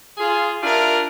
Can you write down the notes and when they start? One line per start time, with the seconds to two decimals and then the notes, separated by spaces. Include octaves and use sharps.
0.17 F4 G#4
0.63 D4 E4 F4 G4 A#4